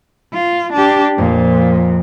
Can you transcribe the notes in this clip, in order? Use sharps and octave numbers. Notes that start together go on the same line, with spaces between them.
F4
D4 G4
F2 A#2